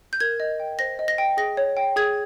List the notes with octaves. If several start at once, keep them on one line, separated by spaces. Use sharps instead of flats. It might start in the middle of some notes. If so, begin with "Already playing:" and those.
G6
A#4 G#6
D#5
G5
C5 A#6
D#5
A#6
G5
G#4 A#6
C#5
G5
G#4 G#6